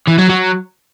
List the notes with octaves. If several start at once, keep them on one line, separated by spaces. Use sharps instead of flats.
E3
F#3
F#3